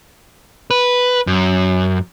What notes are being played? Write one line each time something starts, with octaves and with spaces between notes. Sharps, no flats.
B4
F#2